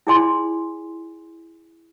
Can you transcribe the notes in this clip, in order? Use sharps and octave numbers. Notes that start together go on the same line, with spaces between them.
E4 F4 G#4 D5 G#5 C6